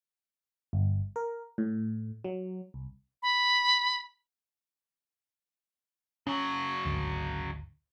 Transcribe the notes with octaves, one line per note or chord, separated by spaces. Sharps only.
G1
A#4
A2
F#3
C2
B5
C#3 F#3 C#4
G#1 D2